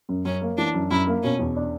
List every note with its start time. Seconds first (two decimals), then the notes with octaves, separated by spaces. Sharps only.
0.09 F#2
0.25 F#2 C#4
0.42 A#3
0.58 E3 D4
0.74 F#2
0.91 F#2 E4
1.07 A#3
1.23 B2 C#4
1.39 E2
1.56 D4